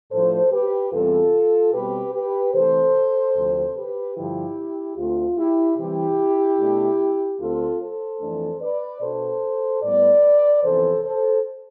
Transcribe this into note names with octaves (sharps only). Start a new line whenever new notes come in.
A2 F3 A3 D4 A4 C5
G4 B4
E2 C3 E3 G3 C4 F4 A4
B2 G3 C4 G4 B4
G4 B4
C3 E3 A3 C4 A4 C5
D2 C3 F3 C4
G4 B4
G2 D3 F3 E4 G4
D2 D3 A3 C4 F4
E4 G4
C3 E3 G3 E4 G4
B2 A3 D4
D2 D3 A3 C4 F4 A4
A4 C5
F2 E3 A3 D4
B4 D5
B2 B3 D4 A4 C5
A2 G3 B3 B4 D5
F2 C3 E3 B3 A4 C5
A4 C5